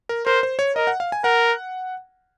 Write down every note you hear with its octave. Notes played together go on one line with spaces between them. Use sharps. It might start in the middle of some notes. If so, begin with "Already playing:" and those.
A#4
A#4 C5
C5
C#5
A#4 D#5
F#5
F5
G#5
A#4 F#5